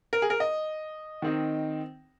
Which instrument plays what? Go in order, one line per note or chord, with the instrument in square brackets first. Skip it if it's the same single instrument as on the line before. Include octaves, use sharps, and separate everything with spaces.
[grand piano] A#4
G#4
A#4
D#5
D#3 C4 D#4